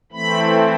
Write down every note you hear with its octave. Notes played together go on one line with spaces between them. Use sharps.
E3 A3 C4 B5